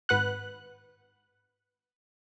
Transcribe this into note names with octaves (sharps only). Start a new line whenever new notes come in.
G#1 B4 F#5 F#6